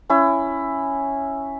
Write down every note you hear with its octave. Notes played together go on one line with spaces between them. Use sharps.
C#4 E4